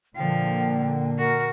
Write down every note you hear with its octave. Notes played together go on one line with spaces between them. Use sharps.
A#2 D3 F3 A#3 G5
F#4 A#4